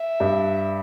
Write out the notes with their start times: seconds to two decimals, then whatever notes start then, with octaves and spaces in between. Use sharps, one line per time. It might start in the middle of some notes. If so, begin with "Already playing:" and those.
Already playing: E5
0.20 G2